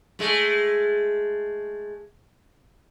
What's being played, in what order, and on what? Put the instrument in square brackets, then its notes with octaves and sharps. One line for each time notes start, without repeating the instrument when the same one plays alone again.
[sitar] G#3 A3